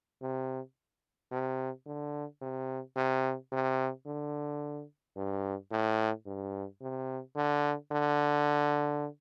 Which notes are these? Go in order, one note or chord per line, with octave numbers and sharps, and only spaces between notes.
C3
C3
D3
C3
C3
C3
D3
G2
A2
G2
C3
D3
D3